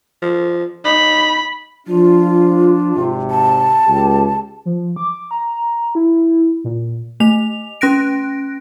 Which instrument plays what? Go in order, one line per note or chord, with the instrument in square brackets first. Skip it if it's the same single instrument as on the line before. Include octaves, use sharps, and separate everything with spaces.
[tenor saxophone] F3
[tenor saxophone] D#4 [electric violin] B5
[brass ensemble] F3 D4 [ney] F4
[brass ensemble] G#1 C3
[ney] A5
[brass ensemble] C#2 G4
[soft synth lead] F3
D6
A#5
E4
A#2
[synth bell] A3 F7
C#4 F#6 A#6 D7